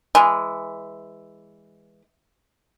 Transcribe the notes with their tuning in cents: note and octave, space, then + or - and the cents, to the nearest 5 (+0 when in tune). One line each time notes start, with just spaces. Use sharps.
E3 +0 G#3 -10